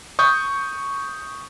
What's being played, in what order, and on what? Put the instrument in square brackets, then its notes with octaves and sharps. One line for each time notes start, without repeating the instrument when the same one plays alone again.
[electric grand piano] C#6 D#6 G6